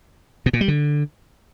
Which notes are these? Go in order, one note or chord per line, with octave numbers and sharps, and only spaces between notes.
B2
A#2
G3
D3